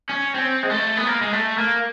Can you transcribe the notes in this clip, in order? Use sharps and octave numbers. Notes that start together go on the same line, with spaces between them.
C#4
C4
G#3
A3
B3
A#3
G#3
A3
A#3